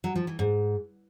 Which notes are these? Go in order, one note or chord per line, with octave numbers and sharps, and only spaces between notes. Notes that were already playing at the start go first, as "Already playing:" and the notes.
F#3
F3
E3
G#2